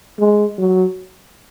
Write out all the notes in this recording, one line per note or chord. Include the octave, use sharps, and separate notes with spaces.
G#3
F#3